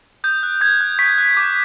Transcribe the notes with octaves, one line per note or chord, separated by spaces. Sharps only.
D#6 G6
F#6
D#6 G#6
F#6
C#6 B6
F#6
D6